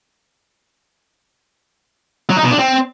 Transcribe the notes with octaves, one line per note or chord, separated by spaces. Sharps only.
F#3
D#4
B2
D4
C4